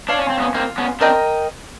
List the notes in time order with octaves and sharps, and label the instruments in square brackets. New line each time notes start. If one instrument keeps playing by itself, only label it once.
[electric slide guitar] D4 [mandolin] C#5 F5 A5
[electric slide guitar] C#4
C4
B3 C#4
[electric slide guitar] A#3 C4 [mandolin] F4
[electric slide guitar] B3 C#4
[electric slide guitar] C4 D4 [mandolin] A#4 D#5 G5